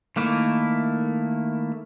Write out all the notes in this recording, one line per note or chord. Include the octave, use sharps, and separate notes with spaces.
D#3 A3 A#3 E4